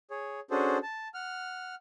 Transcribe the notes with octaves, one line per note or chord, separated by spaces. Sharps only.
G#4 C#5
C#4 D4 F#4 G#4 A4 C5
A5
F#5 F6